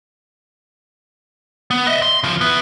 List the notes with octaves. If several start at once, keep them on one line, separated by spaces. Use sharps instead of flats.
B3
D#5 E5
C6
C#3 F3
B3 E4